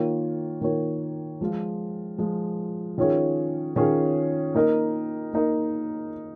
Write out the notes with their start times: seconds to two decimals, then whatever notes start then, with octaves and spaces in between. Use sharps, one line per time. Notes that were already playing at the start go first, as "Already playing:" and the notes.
Already playing: D#3 A#3 F4 C#5
0.61 D#3 A#3 F4 C#5
1.41 F3 G#3 F4
2.18 F3 G#3 F4
2.98 D#3 C#4 F4 G#4 C#5
3.76 D#3 C#4 F4 G#4 C#5
4.55 A#3 D#4 A#4 D#5
5.33 A#3 D#4 A#4 D#5